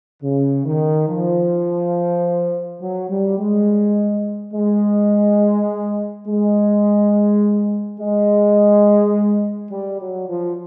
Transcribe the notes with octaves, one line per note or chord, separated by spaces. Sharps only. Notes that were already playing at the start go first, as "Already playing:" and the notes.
C#3
D#3
F3
F#3
G3
G#3
G#3
G#3
G#3
G3
F#3
F3